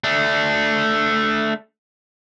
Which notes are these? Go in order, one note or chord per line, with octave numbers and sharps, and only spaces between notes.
A3 D4